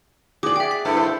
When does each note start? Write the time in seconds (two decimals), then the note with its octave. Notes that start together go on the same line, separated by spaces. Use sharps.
0.43 F#4 G#4 D5 D6 F#7
0.56 E5 G5
0.71 B6
0.85 G2 A3 E4
0.97 C5